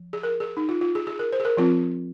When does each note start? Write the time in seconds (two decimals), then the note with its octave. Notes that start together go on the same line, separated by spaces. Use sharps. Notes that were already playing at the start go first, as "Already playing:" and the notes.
Already playing: F3
0.13 G#4
0.23 A#4
0.40 G#4
0.57 D#4
0.69 F4
0.81 F4
0.95 G#4
1.07 G#4
1.19 A#4
1.33 C5
1.40 G#4
1.45 A#4
1.57 F3 C4 F4